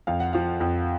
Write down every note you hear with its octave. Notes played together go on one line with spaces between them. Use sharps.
F2 F5
F#5
F3 F5
F2